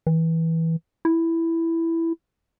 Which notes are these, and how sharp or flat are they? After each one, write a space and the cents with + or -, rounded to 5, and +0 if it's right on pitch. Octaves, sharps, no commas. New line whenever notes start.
E3 -15
E4 +5